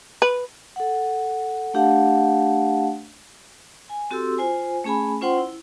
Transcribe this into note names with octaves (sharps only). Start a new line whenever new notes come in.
B4
A4 F#5
A3 D4 G4 F5 F#5 A5
G#5
C4 F#4 G4 A4 C6 E6
F4 C5 G#5
A3 C#4 G#4 G#5 B5
C#4 F4 C5 F#5 G5 C6
E4